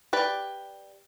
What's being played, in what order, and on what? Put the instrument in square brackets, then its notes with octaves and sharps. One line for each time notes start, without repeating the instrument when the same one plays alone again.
[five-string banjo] G4 B4 D5